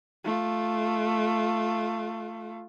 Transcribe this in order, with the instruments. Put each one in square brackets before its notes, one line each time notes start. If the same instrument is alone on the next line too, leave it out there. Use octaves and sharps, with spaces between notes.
[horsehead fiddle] A3 F4